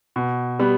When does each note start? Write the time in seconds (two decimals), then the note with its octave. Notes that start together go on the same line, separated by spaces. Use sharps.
0.16 B2
0.59 G3 B3